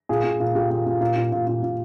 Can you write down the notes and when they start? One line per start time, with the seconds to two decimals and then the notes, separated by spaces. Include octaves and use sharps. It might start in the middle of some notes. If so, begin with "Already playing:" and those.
0.09 A#2 G#4
0.24 A#2
0.40 A#2
0.55 A#2 G4
0.70 A#2
0.86 A#2
1.01 A#2
1.16 A#2
1.32 A#2
1.47 A#2
1.62 A#2